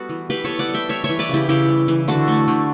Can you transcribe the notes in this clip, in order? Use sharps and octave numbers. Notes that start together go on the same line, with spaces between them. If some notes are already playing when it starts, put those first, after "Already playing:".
Already playing: G3 B3 F#4 A4
E3
E3 G4 B4
B3 A4 C#5
D5 F#5
G3
E5 G5
G3 C#5 E5
C#5 E5
E3
B4 D5
C#3 E4 G4
C#3 E4 G4
G3
E3
D3 F#4 A4
A3
D3